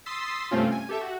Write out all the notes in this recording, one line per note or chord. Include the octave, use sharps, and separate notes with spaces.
C6 D#6 E6 A6 B6 C7
G2 C3 A3 C4 C#4 F4
G#5
G4 A4 E5
F#4